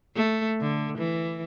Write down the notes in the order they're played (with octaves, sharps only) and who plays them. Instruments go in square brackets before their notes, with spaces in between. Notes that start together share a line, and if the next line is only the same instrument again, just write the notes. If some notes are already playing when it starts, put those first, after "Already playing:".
[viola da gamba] A3
D3
E3